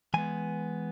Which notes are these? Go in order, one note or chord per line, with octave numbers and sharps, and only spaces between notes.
E3 G#3 B3 G#5